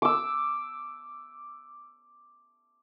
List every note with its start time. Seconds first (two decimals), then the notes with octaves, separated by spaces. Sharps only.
0.02 D6 E6